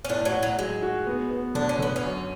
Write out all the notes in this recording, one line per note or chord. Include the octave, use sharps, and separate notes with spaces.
C#4
A2 D4
F#3
A2
F#3
F#3 G#3
F#4
B3
B3
D3 D4
C#4
D3 B3
C#4
F#2